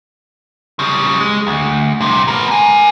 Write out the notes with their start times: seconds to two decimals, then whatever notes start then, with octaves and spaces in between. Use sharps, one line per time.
0.79 C#3 G3
1.20 G#3
1.47 D2
2.01 G2 C3
2.28 B3 A#4
2.51 A#4 G#5